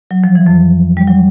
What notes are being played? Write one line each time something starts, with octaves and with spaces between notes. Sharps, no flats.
F#3
F3
E3
F2 F3
G3
F#3